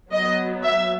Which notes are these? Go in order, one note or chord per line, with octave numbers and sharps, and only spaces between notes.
F#3 B3 D#5
E5